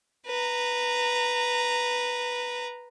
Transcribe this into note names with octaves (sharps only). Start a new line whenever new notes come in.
B4 A#5